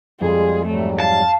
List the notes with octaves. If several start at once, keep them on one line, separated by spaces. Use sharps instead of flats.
F2 G3 G#3 F4 G#4
G#2 F#3 G3 A3
F5 A5